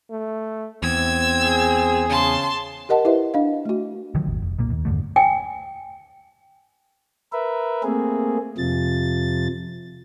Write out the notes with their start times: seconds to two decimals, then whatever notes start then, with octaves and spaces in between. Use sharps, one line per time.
0.11 A3
0.83 E2 C4 E6 G#6
1.43 G#4
2.10 C#3 A5 C6
2.89 G4 A#4 D#5 F#5 A5
3.05 E4 G4 B4 C5 E5
3.34 D4 D#5 F5
3.65 A3 F#4
4.15 D3 D#3 F3 F#3
4.27 D#1 G#1
4.42 F1
4.58 B1 A#2 A#3
4.71 D#2
4.85 E2 G2 D3 A3
5.16 G5 G#5
7.33 A#4 B4 E5
7.83 A3 A#3 C4 G#4
8.58 F2 C3 F3 A6